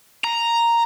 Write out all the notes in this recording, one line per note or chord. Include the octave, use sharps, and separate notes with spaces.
A#5